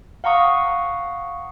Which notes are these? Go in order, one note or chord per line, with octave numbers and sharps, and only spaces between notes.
F5 F#5 A#5 C#6 D#6